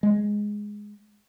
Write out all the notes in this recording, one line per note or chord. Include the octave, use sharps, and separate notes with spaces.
G#3